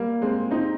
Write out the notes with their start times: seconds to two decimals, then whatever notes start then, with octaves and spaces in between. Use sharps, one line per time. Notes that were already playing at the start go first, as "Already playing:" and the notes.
Already playing: G3 A#3
0.22 G#3 C4
0.51 C4 D#4